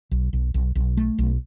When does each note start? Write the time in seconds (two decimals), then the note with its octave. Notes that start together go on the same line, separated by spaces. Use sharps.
0.11 B1
0.33 B1
0.54 B1
0.75 B1
0.97 A3
1.18 B1